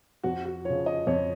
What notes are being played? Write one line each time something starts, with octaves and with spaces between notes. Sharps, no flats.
F2 F#4
F#4
C#3 F3 C#5
D#5
F2 C#5